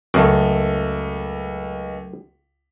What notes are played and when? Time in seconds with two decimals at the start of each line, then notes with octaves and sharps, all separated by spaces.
0.14 C#2 F#2 A3